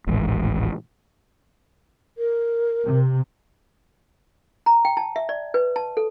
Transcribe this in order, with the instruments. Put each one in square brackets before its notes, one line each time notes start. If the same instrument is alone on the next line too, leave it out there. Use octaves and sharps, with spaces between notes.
[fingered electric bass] D#1 A1 G#2
[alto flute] A#4
[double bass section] C3
[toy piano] A#5
G5
A5
E5
D5
B4
A5
A4